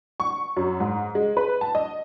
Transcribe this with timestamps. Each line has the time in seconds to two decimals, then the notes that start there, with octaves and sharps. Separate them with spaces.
0.20 C#6
0.57 F#2
0.80 G#2
1.15 G#3
1.37 B4
1.61 A5
1.75 D#5